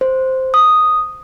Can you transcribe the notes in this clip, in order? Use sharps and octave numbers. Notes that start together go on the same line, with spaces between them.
C5
D#6